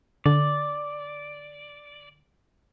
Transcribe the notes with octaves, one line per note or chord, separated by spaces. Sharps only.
D3 D5